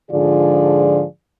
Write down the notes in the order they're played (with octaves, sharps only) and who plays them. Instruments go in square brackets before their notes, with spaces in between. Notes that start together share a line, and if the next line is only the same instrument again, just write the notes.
[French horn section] G#2 D3 F3 F4 G#4 D5